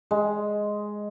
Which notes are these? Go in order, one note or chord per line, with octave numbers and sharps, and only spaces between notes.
G#3